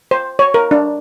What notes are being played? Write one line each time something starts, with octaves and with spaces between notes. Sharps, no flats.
C5
C#5
A#4
D4